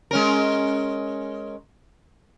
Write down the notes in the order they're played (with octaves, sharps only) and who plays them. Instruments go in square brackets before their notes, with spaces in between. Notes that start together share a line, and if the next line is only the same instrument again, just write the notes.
[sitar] G#3 C#4 A#4